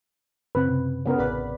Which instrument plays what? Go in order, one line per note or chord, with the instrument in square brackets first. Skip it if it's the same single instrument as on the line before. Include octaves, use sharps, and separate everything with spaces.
[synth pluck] F#2 C#3 C4 [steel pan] B4
[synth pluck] C3
[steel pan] C#3 B3 A#4
[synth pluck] A1 D5 B5 [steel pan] B4